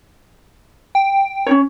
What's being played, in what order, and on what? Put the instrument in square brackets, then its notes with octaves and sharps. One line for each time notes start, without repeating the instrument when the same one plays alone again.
[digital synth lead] G5
[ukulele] C#4 D#4 C#5